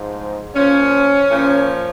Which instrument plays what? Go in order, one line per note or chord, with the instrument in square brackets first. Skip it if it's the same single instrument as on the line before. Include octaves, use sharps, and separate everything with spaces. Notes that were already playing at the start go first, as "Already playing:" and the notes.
Already playing: [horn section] G#2 F3
A#2 F3 C#4
A#2 F3